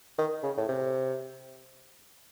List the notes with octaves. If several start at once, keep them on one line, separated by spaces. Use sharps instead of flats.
D#3
C#3
A2
C3